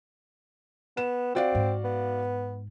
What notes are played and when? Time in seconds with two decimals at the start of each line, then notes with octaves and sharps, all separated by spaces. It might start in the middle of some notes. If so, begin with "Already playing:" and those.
0.97 B3 E7
1.35 C4 F#4 D5 F5
1.55 G#2
1.84 B3